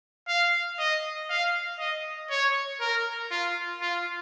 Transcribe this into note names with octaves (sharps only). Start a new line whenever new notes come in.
F5
D#5
F5
D#5
C#5
A#4
F4
F4